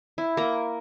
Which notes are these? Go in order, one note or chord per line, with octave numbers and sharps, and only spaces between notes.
E4
A#3 A#5